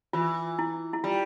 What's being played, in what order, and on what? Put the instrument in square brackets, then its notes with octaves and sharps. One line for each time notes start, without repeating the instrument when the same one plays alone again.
[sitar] E3 [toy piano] F4
[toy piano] E4
E4
[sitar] G3 [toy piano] F4